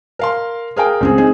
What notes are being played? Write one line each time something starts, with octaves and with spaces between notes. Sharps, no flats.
A#4 F5 C6
G#4 A#4 F5 G5
C#2 C4 G#4
C4 D#4 G#4